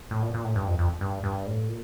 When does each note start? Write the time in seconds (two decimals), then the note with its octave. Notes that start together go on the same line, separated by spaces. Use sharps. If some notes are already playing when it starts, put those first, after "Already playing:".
0.11 A2
0.22 A#2
0.34 A#2
0.44 A2
0.56 G2
0.68 F2
0.79 F2
1.01 G2
1.24 G2
1.47 A2
1.69 A#2